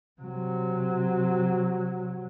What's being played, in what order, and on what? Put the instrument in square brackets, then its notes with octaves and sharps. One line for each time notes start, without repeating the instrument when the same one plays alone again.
[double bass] C3 F#3